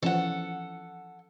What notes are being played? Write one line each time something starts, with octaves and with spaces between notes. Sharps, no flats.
E3 F3 C#4 A4 F#5